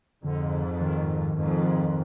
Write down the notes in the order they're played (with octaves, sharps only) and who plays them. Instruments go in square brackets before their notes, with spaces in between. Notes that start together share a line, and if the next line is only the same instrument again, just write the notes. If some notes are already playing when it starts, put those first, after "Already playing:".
[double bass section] F2 G#2 [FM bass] D3
[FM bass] D#3
[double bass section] F2 G#2